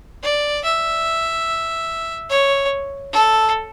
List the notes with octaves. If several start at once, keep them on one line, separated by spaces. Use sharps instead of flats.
D5
E5
C#5
A4